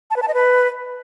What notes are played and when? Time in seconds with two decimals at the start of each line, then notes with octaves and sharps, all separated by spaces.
0.10 A5
0.16 B4
0.22 A5
0.28 D#5
0.34 B4